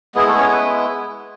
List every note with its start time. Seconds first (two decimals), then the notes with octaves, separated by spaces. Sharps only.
0.15 G#3 B3 E4 G#4
0.27 A3 A4
0.38 C#4 C#5
0.52 B4